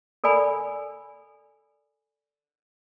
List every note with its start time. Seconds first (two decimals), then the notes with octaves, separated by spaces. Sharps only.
0.24 A4 A#4 D5 G#5 B5